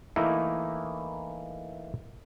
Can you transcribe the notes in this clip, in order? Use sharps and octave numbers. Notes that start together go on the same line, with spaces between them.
E3 A3 A#3 D#4 E4